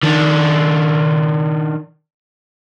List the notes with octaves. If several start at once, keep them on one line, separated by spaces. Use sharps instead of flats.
D#3 D4